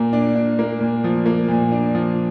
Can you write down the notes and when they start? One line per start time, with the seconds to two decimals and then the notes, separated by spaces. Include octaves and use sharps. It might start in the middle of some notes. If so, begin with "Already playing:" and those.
Already playing: A#2 A#3
0.13 D4
0.35 D4
0.59 A#3
0.80 A#2
1.04 F3
1.26 A#3
1.48 A#2
1.72 D4
1.95 F3